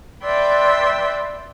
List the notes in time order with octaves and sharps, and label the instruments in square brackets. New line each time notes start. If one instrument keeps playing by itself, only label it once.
[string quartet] B4 D5 E5 G5 C6